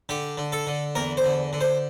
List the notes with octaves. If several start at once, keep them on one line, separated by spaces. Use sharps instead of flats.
D3 G4
D3
A4
D3
E2 A#4
C5
D3
D3
C5